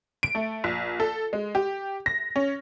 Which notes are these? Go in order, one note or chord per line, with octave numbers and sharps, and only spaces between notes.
D7
A3
A#1
A4
G#3
G4
A#6
C#4